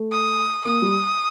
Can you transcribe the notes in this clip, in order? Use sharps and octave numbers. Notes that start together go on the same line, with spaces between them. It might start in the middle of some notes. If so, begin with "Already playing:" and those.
Already playing: A3
D#6
A#3 D#6
G3